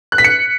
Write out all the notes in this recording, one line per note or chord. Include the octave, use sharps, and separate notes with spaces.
F#6
B6
C#7